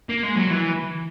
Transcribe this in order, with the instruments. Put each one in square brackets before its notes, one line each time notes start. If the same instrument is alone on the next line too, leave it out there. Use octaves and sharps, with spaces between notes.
[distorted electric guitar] A#3
G#3
F#3
E3